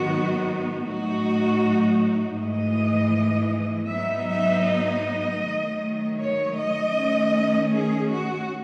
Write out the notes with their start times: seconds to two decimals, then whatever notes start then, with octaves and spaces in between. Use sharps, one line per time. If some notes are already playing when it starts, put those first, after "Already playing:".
Already playing: G#2 D#3 F#3 B3 D#4 F#4
0.86 A2 F#3 A3 D#4 F#4
2.38 G#2 E3 A3 D#5
3.90 G#2 F#3 B3 D#4 E5
4.29 E5
4.66 D#5
5.42 D#3 F#3 A3
6.18 C#5
6.56 D#5
6.95 D#3 A3 C#4
7.71 G#4
8.09 F#4